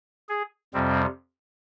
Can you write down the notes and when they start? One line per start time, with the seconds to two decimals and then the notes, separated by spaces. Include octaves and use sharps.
0.29 G#4
0.74 F2 C3 G3 C4